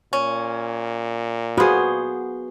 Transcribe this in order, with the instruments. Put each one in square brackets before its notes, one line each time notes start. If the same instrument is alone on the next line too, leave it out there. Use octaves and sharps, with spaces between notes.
[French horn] A#2 [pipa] C#4
[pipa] A#3 C5 [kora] B3 G#4 [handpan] F#4